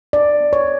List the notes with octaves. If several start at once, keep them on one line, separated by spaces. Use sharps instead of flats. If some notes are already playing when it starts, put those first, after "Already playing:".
D4 D5
B3
C#5